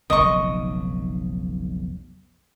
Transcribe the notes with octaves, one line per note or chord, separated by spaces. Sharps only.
F1 B1 C#3 D#5 C#6